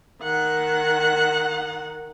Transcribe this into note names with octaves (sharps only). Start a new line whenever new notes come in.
D#3 F#5